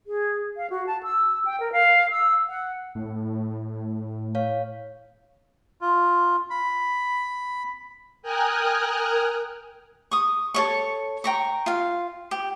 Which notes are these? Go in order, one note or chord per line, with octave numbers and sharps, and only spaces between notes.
G#4
F5
F#4
A5
E6
G5
A#4
F5
E6
F#5
A2
C#5 F5
F4
B5
A#4 G5 G#5 D#6 F6 F#6
C#6 D#6
A4 C#5 C#6
G5 A#5 C#6
F4 F5
G4